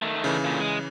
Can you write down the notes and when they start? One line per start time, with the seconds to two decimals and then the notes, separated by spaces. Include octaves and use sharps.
0.02 D#3 A3
0.24 C#3 E3
0.44 A#2 D3
0.60 G#3